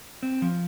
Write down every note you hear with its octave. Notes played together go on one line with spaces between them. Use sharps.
C4
F3